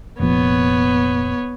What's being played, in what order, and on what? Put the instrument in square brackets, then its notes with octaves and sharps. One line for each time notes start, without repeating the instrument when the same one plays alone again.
[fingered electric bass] F1 A#2 F3 [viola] B3 C#5